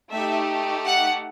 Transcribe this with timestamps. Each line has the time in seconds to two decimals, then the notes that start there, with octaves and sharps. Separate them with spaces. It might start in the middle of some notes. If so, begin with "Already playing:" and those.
0.11 A3 D#4 G4 E5
0.84 F#5